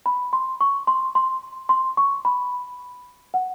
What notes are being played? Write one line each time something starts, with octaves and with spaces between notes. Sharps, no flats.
B5
C6
C#6
C6
C6
C6
C#6
B5
F#5